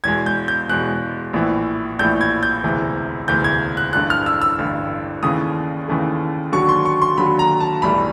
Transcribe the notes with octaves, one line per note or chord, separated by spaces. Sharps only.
E2 B2 G#3 G#6
G6
G6
E2 B2 G#3 F#6
A#1 A2 E3
A#1 A2 E3 G6
G#6
G6
E1 D2 C3 E3
E1 D2 C3 E3 G6
G#6
F#6
A1 G2 D3 F#6
F6
E6
E6
A1 G2 D3
D#2 C#3 E3 A3 D#6
D#2 C#3 E3 A3
D#2 D3 F#3 C#6
C6
C#6
C6
D#2 D3 F#3 B5
A#5
A5
B1 A2 E3 G3 B5